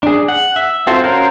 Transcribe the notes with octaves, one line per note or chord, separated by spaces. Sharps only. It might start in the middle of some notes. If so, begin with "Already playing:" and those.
D4 G#4
F#5
E5
C4 F4 F#4 A4 C5
C#4 F#4 A#4 C5 F5